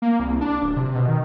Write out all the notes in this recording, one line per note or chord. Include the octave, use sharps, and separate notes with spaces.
A#3
C2
D4
D1
C3
B2
D#3